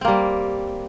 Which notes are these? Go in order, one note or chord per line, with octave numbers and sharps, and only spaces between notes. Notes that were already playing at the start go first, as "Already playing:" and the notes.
G3 A#3 C4